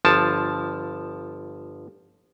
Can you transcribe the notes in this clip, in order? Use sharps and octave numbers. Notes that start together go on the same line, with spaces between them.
G1 F3 A5